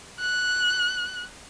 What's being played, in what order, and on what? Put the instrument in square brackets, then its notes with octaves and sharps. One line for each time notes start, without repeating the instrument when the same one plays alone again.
[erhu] F#6